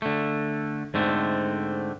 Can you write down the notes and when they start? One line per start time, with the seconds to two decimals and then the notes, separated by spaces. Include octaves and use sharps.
0.02 D3 A3
0.94 G#2 D3 A3 C4